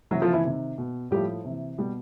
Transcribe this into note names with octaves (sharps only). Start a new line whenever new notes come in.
C3 E3 F#3 F#4
F3 F4
E3 E4
C3 D#3
B2
A2 F3 G3 G4
C3 E3
B2 G3 G4